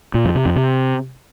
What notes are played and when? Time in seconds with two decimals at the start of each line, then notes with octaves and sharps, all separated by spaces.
0.14 A#2
0.25 F2
0.35 C3
0.45 F2
0.56 C3